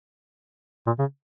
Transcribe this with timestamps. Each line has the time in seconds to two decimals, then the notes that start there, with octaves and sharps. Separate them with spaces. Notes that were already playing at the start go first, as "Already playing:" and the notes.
0.86 A#2
0.99 C#3